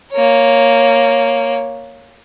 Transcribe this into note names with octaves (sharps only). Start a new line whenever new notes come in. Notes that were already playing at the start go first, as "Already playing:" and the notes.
A#3 C#5